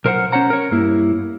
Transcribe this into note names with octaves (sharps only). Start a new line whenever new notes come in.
B1 A#4 C5 F5 F#5
C#4 C5 C#5 F#5 A#5
A#4 C#5
G2 A#3 E4